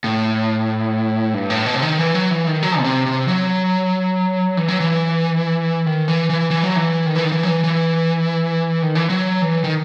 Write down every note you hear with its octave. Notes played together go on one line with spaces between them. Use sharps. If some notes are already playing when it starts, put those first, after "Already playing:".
A2
G2
A2
B2
C3
D#3
E3
F#3
E3
D#3
F#3
B2
C3
C3
F#3
E3
F#3
E3
D#3
E3
E3
E3
F#3
E3
D#3
E3
D#3
E3
F#3
E3
E3
D#3
E3
F#3
E3
D#3